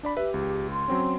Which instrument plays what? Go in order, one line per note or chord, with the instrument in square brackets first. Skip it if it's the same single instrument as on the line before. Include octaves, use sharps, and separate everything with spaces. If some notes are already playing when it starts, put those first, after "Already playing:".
[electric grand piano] D4 D5 B5
[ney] G4 [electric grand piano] B4 E5
[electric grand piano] C#2
[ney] C6
[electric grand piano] F#3 C4 C#4